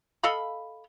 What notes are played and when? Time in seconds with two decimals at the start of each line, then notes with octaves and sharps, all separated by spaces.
0.23 A4 D#5 F5 B5